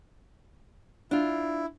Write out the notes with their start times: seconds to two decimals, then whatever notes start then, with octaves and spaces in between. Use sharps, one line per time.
1.11 D4 E4 F4